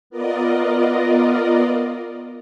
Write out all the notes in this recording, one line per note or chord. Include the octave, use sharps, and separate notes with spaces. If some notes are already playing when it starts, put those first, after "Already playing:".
B3 F4 A#4 D5 D#5